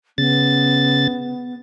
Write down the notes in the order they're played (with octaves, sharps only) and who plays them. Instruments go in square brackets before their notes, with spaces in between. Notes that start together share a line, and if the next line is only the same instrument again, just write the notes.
[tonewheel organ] C#3 A6 [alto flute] B3